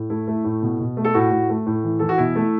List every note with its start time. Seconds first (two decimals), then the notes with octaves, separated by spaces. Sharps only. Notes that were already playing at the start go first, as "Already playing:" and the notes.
Already playing: A2
0.10 A3 E4
0.28 A3
0.45 A2
0.62 B2
0.80 B2
0.97 A3
1.05 A4
1.14 A2 F#4
1.32 A2
1.50 A3
1.66 A2
1.84 E3
1.99 E3 A4
2.09 F#4
2.18 B2 E4
2.36 A3